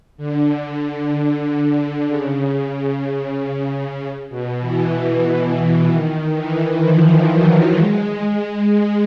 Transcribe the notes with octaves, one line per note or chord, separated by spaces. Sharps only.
D3
C#3
B2
E3
D#3
E3
F3
F#3
G#3
G#3